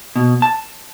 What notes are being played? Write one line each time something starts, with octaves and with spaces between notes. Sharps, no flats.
B2
A5